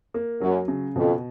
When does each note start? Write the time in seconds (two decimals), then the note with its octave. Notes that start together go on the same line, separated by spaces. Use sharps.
0.14 A#3
0.41 F#2 F#3
0.68 C#3
0.95 F2 B2